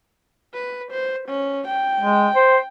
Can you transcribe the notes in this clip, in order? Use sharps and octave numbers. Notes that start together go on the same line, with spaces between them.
B4
C5
C#4
G5
G#3
C5